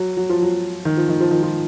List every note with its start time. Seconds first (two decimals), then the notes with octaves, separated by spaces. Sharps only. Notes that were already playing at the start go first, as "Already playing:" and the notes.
Already playing: F#3
0.17 F#3
0.29 F3
0.42 F#3
0.85 D#3
0.97 F3
1.09 D#3
1.20 F3
1.31 D#3
1.43 F3